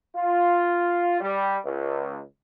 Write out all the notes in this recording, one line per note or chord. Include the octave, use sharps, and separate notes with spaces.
F4
G3
C#2